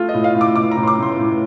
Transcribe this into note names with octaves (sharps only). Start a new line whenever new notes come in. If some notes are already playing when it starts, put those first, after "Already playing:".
Already playing: A3 F4
D#5
A2
F5
A2
D6
A2 D6
A#5
A2
C6
D6
A2 C6
A2